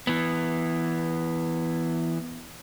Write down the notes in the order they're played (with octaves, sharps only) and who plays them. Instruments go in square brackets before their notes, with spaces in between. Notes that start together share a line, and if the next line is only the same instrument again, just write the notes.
[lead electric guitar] E3 B3